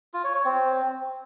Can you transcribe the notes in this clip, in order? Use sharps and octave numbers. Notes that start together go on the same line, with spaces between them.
F4
C#5
C#5
C4